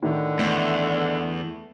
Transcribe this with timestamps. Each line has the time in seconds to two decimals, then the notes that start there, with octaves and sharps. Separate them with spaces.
0.02 A2 D3 D#3
0.39 E2 A3